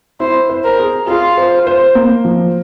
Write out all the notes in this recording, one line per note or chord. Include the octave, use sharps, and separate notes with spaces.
E4 C5
C5
A#4
G#4
F4 G#4
C5
C5
A#3
F3